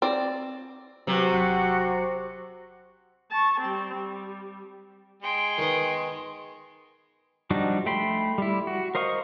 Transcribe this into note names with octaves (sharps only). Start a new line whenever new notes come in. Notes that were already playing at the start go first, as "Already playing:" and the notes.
C4 D5
C3 F#3 F#4 B4 E6
G1 F#3 F#5
A5 C#6
G3 C4
G3
G#3 G5 C6
D#3 B3
F3 G3 D4 D#4 F#4
A3 G5 B5 C6
G3 E4
F#4
A#4 C5 D#5 F5 C#6